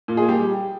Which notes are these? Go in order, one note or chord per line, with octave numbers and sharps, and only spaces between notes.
A#2
G#4
G3 G4